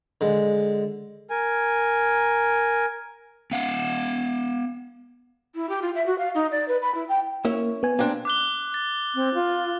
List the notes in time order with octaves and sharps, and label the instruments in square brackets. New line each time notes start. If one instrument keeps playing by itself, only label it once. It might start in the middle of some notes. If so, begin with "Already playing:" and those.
[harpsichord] D3 G#3
[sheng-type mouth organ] A#4 G#5
[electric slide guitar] B3 F5 F#5
[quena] E4
G4
F4
E5
F#4
F5
D#4
D5
B4
B5
E4
G5
[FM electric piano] A#3 [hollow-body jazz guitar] C#4 E4 E5
[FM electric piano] B3 G#5
[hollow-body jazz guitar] A#3 C4 D4
[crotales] D6 F#6 G7
A6
[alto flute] C4
F4